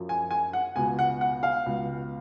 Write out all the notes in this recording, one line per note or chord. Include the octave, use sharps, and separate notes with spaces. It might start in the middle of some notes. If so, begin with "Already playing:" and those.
Already playing: F#2 F3
G#5
G#5
F#5
C#2 B2 G#5
F#5
F#5
F5
C#2 B2